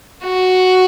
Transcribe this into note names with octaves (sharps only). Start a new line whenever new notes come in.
F#4